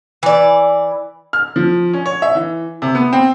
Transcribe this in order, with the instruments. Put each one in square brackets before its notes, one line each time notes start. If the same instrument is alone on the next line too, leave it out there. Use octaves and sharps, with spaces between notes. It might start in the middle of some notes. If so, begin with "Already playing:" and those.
[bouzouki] E3 D5
[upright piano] F6
F3
C#4
C#5
E5
E3
C3
B3
C4